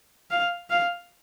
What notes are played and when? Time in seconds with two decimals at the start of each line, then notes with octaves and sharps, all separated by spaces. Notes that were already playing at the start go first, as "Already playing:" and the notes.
0.31 F5
0.70 F5